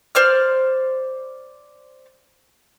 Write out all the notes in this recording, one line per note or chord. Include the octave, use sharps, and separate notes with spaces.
C5 D5 F6